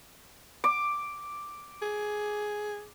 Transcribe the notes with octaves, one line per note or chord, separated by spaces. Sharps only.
D6
G#4